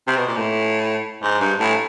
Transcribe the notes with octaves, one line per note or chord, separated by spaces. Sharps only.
C3
B2
A#2
A2
G#2
G2
A2